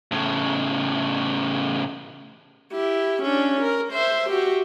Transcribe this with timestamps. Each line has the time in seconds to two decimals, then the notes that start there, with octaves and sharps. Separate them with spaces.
0.12 A2 C#3
2.72 E4 G4
3.22 C#4 D4
3.61 A#4
3.92 C5 E5
4.29 F#4 G4